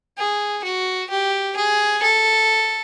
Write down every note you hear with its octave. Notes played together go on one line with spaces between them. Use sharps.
G#4
F#4
G4
G#4
A4